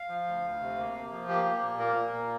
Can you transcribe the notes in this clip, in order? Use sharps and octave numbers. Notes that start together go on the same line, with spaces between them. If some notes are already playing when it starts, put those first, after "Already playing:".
Already playing: F5
F3
D2
D2
C3
A#3
A#3
F3
A#3 G4
A#3
A#2
A#3 A#4
A#2
A#3